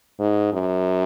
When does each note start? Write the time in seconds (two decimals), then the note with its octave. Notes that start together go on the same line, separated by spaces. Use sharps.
0.20 G#2
0.53 F#2